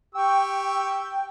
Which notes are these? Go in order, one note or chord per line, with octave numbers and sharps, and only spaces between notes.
G4 G5 C#6 E6